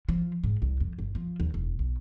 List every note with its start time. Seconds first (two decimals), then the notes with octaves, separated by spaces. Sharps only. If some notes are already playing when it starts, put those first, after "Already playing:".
0.09 F3
0.44 G#2
0.62 C2
0.80 F2
0.99 G1
1.15 F3
1.40 D#2
1.54 E1
1.79 B1